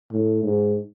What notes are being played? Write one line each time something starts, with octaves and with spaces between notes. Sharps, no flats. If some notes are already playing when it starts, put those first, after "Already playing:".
A2
G#2